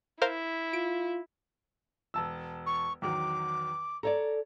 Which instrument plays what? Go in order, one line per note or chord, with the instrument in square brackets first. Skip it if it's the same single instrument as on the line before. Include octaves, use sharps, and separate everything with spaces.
[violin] E4 [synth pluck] A#4 C5 F5
[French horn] F4 [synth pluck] D7
[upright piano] E1 A5 E6
[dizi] C#6
[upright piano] E2 D#3 F#3 [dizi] D6
[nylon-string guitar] A4 C#5 D5 [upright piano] A#5